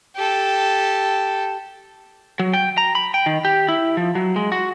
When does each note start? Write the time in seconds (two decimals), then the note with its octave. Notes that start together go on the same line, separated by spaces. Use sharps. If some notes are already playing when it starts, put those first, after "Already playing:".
0.15 G4 A4
2.39 F#3
2.53 G5
2.78 A#5
2.95 B5
3.14 G5
3.26 D#3
3.45 G4
3.69 E4
3.97 F3
4.15 F#3
4.36 G#3
4.52 F#4